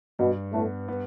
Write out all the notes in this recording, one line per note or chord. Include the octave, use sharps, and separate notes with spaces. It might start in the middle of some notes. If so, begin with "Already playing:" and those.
G2 B2
A2 A3 B3
B3